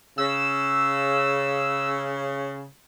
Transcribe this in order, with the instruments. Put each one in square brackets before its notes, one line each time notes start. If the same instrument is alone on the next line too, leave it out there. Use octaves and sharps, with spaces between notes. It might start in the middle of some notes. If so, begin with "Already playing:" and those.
[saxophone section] C#3 [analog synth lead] E6